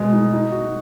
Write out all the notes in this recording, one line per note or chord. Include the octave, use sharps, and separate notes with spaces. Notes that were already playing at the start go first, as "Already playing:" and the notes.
Already playing: B2 G#3 G#4
D#4
D#4
F#4